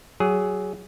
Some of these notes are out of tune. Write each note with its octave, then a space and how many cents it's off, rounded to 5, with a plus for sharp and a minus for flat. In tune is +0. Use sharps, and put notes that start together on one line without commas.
F#3 +20 G#4 +0